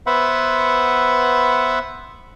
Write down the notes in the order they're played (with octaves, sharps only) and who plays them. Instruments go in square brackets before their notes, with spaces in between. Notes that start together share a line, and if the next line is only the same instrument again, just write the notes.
[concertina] B3 B4 C5 E5 F#5